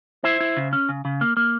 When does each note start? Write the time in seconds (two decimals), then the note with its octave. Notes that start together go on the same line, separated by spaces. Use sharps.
0.24 E4 C5 E5
0.40 E4
0.57 C#3
0.73 C#4
0.89 C#3
1.05 C#3
1.21 A#3
1.37 A#3